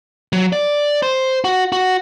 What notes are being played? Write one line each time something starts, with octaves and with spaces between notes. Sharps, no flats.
F#3
D5
C5
F#4
F#4